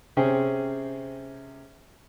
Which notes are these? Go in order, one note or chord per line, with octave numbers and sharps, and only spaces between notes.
C3 C#4 G#4 C5 G5